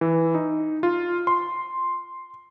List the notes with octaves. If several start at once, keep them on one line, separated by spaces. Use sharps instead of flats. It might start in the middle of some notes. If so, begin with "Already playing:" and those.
E3
D#4
F4
C6